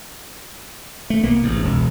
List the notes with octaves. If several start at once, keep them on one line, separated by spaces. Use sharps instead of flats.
A3
C2 A#3 B3
A1 G#2
E1 C#2